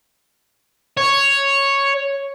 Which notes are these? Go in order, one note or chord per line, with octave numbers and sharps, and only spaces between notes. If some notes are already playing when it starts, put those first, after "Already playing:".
C#5